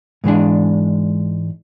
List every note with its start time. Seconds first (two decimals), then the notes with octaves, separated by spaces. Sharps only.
0.24 G#2 E3 G#3 D4